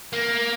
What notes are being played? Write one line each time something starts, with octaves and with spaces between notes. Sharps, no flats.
A#3